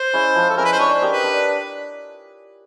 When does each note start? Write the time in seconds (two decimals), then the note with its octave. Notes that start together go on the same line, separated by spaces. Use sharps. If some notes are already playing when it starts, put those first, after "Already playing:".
Already playing: C5
0.13 G#3 C#4 E4
0.36 F3
0.49 A4
0.57 G#3 C#4 E4 A#4
0.64 B4
0.72 C5
0.79 D4 C#5
0.94 C5
1.02 G4 A#4 D#5
1.10 B4
1.24 D4